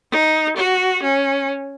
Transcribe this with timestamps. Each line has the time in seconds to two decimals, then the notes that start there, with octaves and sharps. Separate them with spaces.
0.12 D#4
0.57 F#4
1.03 C#4